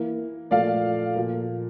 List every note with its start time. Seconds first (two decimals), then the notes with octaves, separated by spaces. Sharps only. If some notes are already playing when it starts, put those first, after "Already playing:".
Already playing: E3 A#3 E4
0.51 A#2 F3 A3 D5 F5
1.15 A#2 F3 A#3